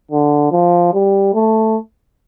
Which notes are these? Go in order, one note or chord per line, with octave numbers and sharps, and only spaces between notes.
D3
F3
G3
A3